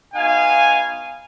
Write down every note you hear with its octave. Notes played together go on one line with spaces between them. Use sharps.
B3 D#4 F#4 F5 G#5